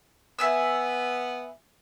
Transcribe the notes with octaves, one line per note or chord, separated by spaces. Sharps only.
B3 E5 G#5 E6